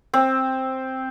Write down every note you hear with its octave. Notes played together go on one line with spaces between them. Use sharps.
C4